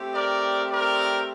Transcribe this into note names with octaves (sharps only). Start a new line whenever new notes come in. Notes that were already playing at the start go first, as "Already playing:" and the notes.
Already playing: A3 C4 G4
A#4 D5
A#4 D5